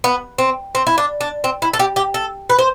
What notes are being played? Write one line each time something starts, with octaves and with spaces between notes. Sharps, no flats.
B3
C4
C4
E4
D4
D4
C4
E4
A4
G4
G4
A4
B4
C5